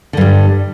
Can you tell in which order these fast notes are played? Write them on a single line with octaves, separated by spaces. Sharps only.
D3 G2 G3